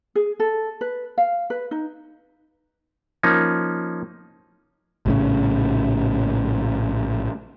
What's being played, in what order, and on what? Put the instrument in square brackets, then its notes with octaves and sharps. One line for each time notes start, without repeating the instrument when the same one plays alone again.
[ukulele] G#4
A4
B4
F5
B4
D#4
[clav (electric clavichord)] F3 A#3 C#4 D#4
[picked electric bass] A#1 A2 C#3